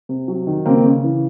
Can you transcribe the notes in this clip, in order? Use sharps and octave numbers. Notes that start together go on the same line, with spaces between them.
C3
F#3
D#3
C#3 A#3 C4
C#3
E3